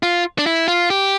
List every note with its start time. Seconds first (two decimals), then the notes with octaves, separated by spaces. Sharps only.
0.03 F4
0.38 D4
0.46 E4
0.68 F4
0.90 G4